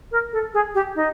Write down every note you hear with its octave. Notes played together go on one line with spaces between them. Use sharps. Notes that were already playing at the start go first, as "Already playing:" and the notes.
A#4
A4
G#4
G4
D#4